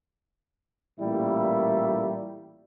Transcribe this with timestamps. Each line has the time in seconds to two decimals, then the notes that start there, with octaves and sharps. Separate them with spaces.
1.00 A1 A#2 G3 A3 A#3 E4